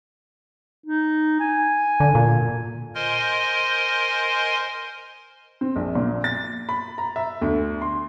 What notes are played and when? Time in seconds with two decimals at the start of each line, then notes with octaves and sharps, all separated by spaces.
0.86 D#4
1.40 G#5
2.00 D3
2.15 A#2
2.95 A#4 C5 D#5 G#5 C6
5.61 C4
5.76 A#1
5.95 A#2
6.24 A6
6.69 B5
6.98 A#5
7.16 E5
7.41 D2
7.82 C6